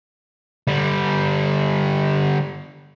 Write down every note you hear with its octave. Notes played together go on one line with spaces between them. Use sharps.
D3 G3